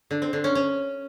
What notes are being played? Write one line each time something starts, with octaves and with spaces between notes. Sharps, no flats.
D3
C4
D3
C#4
C#4